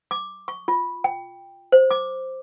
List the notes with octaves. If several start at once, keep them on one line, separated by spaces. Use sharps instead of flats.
D6
C#6
F4
G5
C5
D6